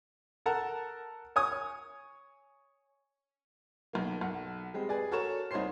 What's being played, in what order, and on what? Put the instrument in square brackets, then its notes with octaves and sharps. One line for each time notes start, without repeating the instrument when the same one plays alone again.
[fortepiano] A4 A#4 F#5 A5 A#5
C#5 G#5 D#6
[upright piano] B1 A#3
B1 F#5
G3 G#3 C4
G#4 B4 D5
F#4 A4 A#4 C#5 C#6 E7
C2 D#4 C5 C#5 C6 C7